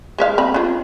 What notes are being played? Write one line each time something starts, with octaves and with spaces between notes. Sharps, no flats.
G#3 E5 F5
C4 B5
C#4 F4